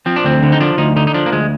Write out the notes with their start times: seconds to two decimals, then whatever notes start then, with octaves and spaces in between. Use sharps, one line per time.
0.06 F3 C4
0.16 D4
0.24 D2 C4
0.43 D3
0.52 D#4
0.60 F3 D4
0.78 D2 D#4
0.96 D3 D#4
1.07 D#4
1.14 F3 D4
1.26 A#3
1.32 D2 G#3